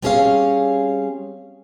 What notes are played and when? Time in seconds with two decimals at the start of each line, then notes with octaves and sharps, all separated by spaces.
0.02 G3 C4 C#4 G#4 C#5 F5